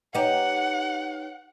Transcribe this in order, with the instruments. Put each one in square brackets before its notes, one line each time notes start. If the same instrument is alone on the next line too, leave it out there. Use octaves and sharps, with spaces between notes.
[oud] D#4 G4 [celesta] B4 C#5 [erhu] F#5